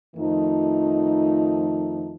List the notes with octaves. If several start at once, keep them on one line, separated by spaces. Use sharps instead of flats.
F2 D#3 F3 A3 D#4